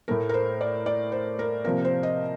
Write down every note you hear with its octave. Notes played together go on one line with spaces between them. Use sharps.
A2 A3 A#4
A#4
C5
D5
D5
C5
A#4
C3 F3 A#3 A#4
C5
D#5